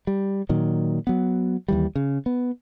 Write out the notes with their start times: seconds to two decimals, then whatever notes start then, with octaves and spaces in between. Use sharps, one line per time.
0.07 G3
0.49 A#2 D#3 F#3
1.07 F#3 B3
1.68 D#2 E3 G3
1.96 C#3
2.26 B3